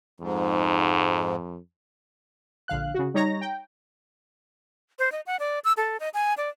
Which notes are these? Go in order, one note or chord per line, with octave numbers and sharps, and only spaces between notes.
F2 G#2
A#1 D3 F5 F#6
C#3 F#4
G3 D#4 C#5 A#5 A#6
G5
C5
D#5
F#5
D5
E6
A4
D#5
G#5
D5